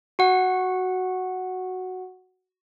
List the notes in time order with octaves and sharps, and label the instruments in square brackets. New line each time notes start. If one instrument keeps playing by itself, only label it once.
[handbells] F#4 F#5